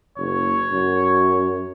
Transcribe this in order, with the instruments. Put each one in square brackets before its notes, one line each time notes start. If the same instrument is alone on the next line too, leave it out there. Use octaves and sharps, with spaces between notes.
[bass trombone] F#1 [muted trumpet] C#5
[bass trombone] F#2